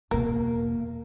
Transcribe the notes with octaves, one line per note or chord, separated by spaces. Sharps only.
E2 B2 A#3 A#4